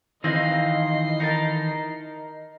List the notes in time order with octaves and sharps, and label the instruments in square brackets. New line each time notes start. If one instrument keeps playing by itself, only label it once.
[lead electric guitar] D#3 E3 [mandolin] C4 D#4 F5 [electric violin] D#5 C7
[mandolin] D#4 A#4 A5